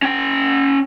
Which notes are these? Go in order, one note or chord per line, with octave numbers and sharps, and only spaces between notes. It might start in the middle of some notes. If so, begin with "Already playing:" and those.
C#4 G5